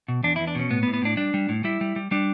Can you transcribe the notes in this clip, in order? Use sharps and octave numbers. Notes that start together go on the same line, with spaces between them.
B2
E2 D4
E4
E2
D4
B2 C#4
A2 B3
B3
A2
B3
A2 D4
G3 D4
G3
A2
G3 E4
G3
G3
G3 D4